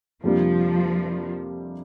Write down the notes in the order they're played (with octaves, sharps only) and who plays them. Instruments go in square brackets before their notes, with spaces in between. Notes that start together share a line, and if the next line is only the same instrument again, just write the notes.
[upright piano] F2 C3 G3 A#3 D4 [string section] F3